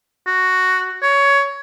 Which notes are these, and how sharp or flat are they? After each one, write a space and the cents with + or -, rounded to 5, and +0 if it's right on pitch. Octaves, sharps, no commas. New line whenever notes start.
F#4 +5
C#5 +15